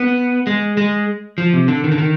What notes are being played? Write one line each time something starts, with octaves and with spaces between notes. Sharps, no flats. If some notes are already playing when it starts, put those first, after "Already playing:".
Already playing: B3
G#3
G#3
F3
C3
D3
D#3
D3
D#3